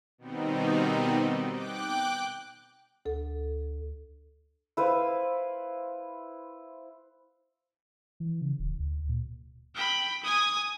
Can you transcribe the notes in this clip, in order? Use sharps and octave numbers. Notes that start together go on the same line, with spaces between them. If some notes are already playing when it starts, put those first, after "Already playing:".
B2 D#3 G3 B3 C4 D#4
G5 D6 F#6
D2 A4
E4 B4 C5 F5
E3
C#3
D#1
D2
A#2
G5 B5
G#5 D#6